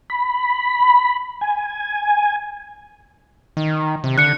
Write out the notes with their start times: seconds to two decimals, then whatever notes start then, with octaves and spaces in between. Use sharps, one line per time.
0.10 B5
1.41 G#5
3.57 D#3
4.04 C3
4.18 D3 F#6 C#7